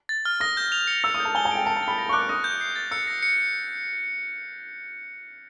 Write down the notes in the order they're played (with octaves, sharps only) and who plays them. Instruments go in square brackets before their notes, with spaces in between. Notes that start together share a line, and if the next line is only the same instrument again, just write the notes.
[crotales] A6
F6
[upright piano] D#6 [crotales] A#6
[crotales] G6
F7
C#7
[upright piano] E6 [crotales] A#6
[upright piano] D#6
[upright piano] A5 [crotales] G6
[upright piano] G#5 [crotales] G7
[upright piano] G#5
[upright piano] G5 [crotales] D7
[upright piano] A5 [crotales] C#7
[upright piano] A5
[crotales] A6
[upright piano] B5
[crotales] A#6
[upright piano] C#6
[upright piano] D6 [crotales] F#6
[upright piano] D#6 [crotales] A#6
[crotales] G6
C7
A6
[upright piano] E6 [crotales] C#7
[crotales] A#6
C#7